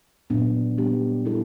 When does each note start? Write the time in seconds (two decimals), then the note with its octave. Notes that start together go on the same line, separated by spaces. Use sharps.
0.30 A#2 F#3 B3 D4
0.78 G3 B3 D4 G4
1.25 G3 B3 E4 A4